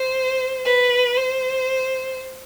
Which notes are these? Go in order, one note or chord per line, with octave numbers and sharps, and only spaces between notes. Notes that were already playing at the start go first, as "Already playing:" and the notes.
Already playing: C5
B4
C5